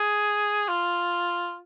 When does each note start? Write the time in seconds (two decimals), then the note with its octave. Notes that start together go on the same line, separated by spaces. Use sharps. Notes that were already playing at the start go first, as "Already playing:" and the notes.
Already playing: G#4
0.68 F4